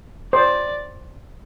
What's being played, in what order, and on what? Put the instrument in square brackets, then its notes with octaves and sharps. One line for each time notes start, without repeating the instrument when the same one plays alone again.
[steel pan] C5 [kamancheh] D5